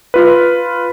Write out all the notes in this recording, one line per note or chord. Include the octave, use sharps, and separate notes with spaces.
F4 B4